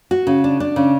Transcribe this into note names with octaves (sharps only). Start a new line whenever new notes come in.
F#4
C#3
D4
D4
C#3